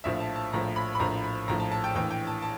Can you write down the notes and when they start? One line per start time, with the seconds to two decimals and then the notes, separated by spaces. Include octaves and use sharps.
0.04 A#1 A2 F3 E5
0.20 A5
0.36 A5
0.53 A#1 A2 F3 A#5
0.76 B5
0.95 B5
0.99 A#1 A2 F3 A#5
1.24 B5
1.48 A#1 A2 F3 A#5
1.60 A5
1.72 A5
1.84 G5
1.95 A#1 A2 E3 G5
2.11 G5
2.27 A5
2.42 A5